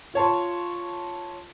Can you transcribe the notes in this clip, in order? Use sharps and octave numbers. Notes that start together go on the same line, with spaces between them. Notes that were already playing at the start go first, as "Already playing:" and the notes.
F4 C#5 A5 C6